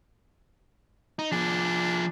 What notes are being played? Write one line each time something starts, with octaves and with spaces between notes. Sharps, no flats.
D#4
F3 D4 G#4